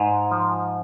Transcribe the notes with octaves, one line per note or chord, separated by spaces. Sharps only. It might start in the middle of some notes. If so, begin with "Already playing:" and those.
Already playing: G#2
F3